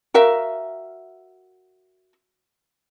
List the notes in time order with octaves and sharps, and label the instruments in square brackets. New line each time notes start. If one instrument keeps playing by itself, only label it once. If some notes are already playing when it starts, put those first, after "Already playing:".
[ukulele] F#4 A#4 E5 F5